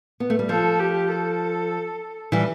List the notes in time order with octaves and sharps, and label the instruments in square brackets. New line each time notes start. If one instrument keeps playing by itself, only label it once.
[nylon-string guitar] B3
A3
G3
[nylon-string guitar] F3 [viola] A4
[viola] G4
A4
[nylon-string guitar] E3 G3